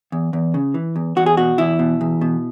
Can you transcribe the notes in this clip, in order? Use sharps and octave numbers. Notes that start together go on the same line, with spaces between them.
E2
E2
C#3
E3
E2
E2 F#4
G#4
B2 F#4
E2 E4
B2
E2
B2